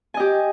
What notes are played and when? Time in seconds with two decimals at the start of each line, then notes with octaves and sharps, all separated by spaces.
0.14 G#5
0.17 D#5
0.20 G4